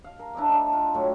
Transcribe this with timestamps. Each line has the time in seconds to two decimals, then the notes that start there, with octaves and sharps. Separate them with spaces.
0.04 F5
0.19 A#4
0.35 D4 E4 D#5 D6
0.49 D4 D#4 A5
0.73 F4
0.94 A2 F#3 G5